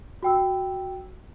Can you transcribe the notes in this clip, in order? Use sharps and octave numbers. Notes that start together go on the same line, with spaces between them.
F#4 G5 E6